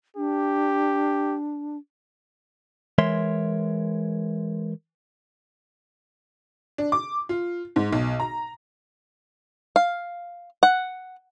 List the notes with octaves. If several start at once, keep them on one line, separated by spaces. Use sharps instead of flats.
D4 G4
E3 G#3 A#4 C#5 E5 C6
D4
D6
F4
G#2
B1
A#5
F5
F#5